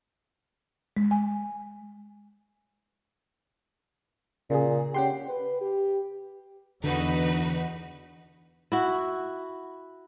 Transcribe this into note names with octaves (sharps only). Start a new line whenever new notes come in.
G#3
G#5
A#2 C#3 G#4
C#4 G4 F#5 C6
B4
G4
E2 D3 D#4 F#4 B4
E4 F#4